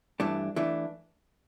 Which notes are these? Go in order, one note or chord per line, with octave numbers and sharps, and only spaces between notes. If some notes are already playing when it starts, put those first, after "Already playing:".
G2 E3 A3 D4
E3 A3 D4